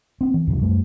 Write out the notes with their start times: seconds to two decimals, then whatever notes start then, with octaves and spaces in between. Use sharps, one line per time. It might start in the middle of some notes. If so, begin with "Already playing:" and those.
0.21 B3 C4
0.34 E3
0.47 E2 G2 C3 F3
0.62 F#2 G3 A3